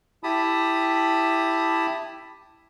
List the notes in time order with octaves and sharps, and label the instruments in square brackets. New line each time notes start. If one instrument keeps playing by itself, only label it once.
[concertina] E4 G4 A5 B5 D#6